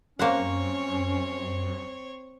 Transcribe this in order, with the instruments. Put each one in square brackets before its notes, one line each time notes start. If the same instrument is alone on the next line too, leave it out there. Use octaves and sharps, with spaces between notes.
[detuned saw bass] F#2 [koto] A#3 C5 F#5 [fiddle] C4 C#5 [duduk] C#4